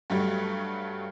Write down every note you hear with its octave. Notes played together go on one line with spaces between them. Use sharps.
G2 F#3 G3 A3